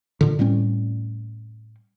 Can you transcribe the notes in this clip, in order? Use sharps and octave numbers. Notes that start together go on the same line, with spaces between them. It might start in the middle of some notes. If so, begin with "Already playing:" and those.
A#2 D3
A2 G3 C4 C#4